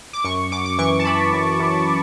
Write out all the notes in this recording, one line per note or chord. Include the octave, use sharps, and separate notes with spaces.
D6
F#2 C#6
F#2 D6
D6
E3 C#6
A5
E3 B5
F#2
F#2